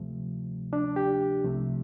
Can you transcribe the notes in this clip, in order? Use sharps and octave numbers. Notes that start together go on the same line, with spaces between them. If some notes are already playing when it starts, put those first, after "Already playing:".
Already playing: D2 C3 F3 A3
D4
G4
C2 C3 F3 A3